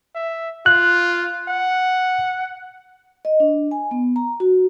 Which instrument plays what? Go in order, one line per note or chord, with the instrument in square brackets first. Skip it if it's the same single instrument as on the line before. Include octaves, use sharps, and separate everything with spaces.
[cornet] E5
[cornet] F4 [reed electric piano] F#6
[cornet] F#5
[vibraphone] D#5
D4
G#5
B3
A#5
F#4